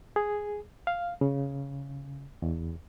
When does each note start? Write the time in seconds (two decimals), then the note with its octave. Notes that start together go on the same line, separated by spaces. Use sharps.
0.16 G#4
0.87 F5
1.21 C#3
2.42 E2